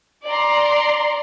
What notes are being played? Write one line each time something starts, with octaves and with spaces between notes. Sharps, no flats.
D5 A#5 C6